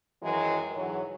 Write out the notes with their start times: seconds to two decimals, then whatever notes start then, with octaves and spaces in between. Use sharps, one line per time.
0.21 F#2 D#3 E3 F#3 G#3
0.73 G#2 D3 E3 F#3